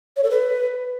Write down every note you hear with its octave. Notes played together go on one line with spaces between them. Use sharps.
C#5
A4
B4